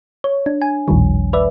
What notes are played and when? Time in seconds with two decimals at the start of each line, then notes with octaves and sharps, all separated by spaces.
0.24 C#5
0.46 D4
0.62 G#5
0.88 A1 D#2 A#2 D#3 F3 G3
1.33 B4 D5 E5